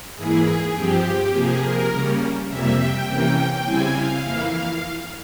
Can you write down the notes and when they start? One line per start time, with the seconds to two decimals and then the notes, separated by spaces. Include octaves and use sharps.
0.16 G#2 E3 A#3 E4 G#4
0.74 G2 F3 C4 G4
1.32 C3 F3 A#3 G#4
1.61 A#4
1.90 C#3 G3 A#3 C#4
2.48 F2 C3 G3 A#3 E5
2.77 G5
3.07 C3 E3 A#3 C#4
3.63 C#3 G3 C4 E4 G#5
3.93 F5
4.23 F2 E3 A#3 E4